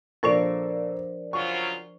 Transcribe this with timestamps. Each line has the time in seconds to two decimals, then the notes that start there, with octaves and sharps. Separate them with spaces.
0.23 A#2 F3 D4 A4 A#4 C5 D5 C#6
1.33 C#3 F#3 F4 C#6